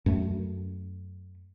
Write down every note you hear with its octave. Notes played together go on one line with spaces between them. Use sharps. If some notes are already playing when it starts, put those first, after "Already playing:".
F#2 A3